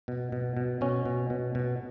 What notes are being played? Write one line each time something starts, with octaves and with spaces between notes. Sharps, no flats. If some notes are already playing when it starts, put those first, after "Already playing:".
B2
B2
B2
B2 C#4
B2
B2
B2